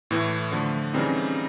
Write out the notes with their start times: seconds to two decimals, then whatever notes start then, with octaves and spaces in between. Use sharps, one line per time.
0.11 A2 E3 A3
0.52 D3 F3 A3
0.93 C#3 E3 G3 C4 D#4